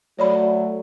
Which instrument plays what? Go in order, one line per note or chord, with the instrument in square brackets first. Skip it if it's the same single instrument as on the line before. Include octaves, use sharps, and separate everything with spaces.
[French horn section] F#3 A3 [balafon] C#5 D5 B5